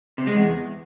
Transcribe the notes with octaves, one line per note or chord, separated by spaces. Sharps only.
C3
G#3
E2